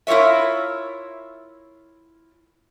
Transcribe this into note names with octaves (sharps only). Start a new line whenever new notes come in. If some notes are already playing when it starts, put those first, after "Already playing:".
E4 F4 A#4 C#5 E5